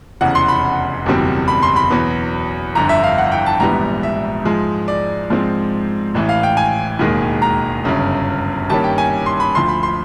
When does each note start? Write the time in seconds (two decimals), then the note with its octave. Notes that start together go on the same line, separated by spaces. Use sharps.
0.21 F1 E2 C#3 F#5
0.35 C6
0.48 B5
1.06 F#1 E2 B2 G3 C4
1.48 B5
1.63 C6
1.76 B5
1.90 E2 B2 F#3 B3
2.75 G1 F2 D3 A#5
2.89 E5
3.03 F5
3.18 F#5
3.32 G5
3.46 A5
3.60 A#1 G#2 E3 G3 B3 A#5
4.03 E5
4.45 G#2 F3 G#3
4.88 D5
5.30 G#2 F3 G#3 C4
6.15 A1 A2 E3
6.29 F5
6.43 G5
6.57 G#5
6.99 E1 D#2 D#3 G#3
7.42 A#5
7.85 G1 F#2 C#3
8.70 G2 D#3 G3 A#3 C#4 A5
8.84 G5
8.98 G#5
9.26 C6
9.40 B5
9.55 D2 D3 F3 C6
9.68 B5
9.83 C6